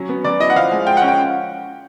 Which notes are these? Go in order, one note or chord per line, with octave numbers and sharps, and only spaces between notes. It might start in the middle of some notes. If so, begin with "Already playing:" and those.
Already playing: F#3 C#4
B3
F#3 D5
E4 D#5
F#5
F3 F5
G#3
F4 G5
F#5
C#4
G5